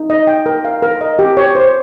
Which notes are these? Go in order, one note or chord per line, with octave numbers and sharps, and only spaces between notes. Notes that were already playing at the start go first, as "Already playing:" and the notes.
Already playing: D#4
D#5
G5
A#4
F5
A#4
D#5
G4
C#5
C5